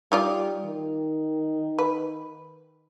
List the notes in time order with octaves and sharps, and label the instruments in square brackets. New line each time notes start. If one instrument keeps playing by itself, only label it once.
[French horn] G3 [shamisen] D#4 F4 D5
[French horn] D#3
[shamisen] B4